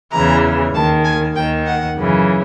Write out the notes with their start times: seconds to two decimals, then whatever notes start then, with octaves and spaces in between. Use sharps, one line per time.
0.13 E2 C#3 E3 A#5
0.74 D#2 D#3 A5
1.05 G#5
1.35 D#2 D#3 G5
1.66 F#5
1.97 F#2 C#3 E3